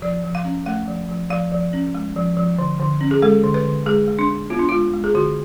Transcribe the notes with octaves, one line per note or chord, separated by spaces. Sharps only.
F3 D5
F3
F5
C#4
A3 F5
F3
F3
F3 F5
F3
C#4
G#3
F3
F3
D3
D3
C#4
G#4
G#3 A4
D3
B4
D3
G#3 G#4
G#3
D4
D4
B3 F4
D4
G#3 F4
G#3
G#4
D3 F#4